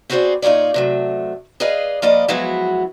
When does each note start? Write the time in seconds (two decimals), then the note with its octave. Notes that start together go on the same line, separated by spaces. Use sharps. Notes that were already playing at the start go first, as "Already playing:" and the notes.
0.10 C4 F#4 G#4 B4 C5 D5
0.42 A#2 D#4 F4 C#5 D5
0.74 C3 F#3 A3
1.60 G#4 B4 D5 D#5 F5
2.02 F3 A#3 A#4 B4 D5 D#5
2.28 F3 F#3 G#3 B3 E4 F#4